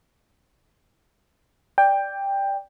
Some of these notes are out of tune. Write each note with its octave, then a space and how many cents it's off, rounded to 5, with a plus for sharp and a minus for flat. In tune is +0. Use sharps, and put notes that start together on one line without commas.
D5 -5 G5 +15